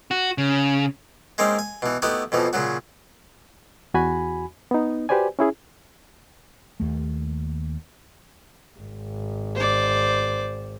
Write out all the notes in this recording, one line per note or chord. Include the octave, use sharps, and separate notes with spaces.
F#4
C#3
G#3 A#3 C4 C#4 D#4
G#5
B2 E3
A3 B3 D#4 E4 F#4 G4
F2 B2 E3 F3
A#2 C#3 F#3 F#4
E2 F#4 G#5 B5
B3 D#4
F#4 G4 B4 C5 D5 G#5
C#4 E4 G#4
D#2 A3
G#1
C5 D5